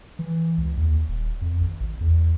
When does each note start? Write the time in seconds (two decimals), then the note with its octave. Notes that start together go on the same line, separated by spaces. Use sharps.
0.19 E3
0.58 C#2
0.77 D#2
1.08 D#1
1.41 F2
1.61 G#1
1.80 G#1
2.01 E2